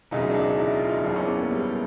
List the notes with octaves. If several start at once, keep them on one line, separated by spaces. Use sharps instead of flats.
E1 D2 C#3 F#3 D#4
D4
D#4
E4
F4
D#4
F#1 E2 C#3 D4
C#4
B3
A#3
G3